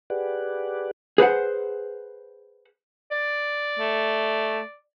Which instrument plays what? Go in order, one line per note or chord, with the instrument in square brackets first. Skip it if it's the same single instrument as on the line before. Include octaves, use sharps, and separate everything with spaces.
[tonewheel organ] G4 G#4 B4 D5 F#5
[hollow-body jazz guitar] G#4 B4 C5 F#5
[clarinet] D5
[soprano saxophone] A3